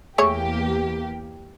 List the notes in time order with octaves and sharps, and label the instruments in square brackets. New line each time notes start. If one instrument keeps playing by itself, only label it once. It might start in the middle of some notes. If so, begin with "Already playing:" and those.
[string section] E2 A#3 G4 [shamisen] A3 G#4 C#5